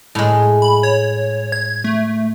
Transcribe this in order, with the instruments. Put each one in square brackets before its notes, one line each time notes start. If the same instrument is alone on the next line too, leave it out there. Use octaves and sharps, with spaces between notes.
[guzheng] A2 G#3
[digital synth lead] B5
C#5
G#6
A3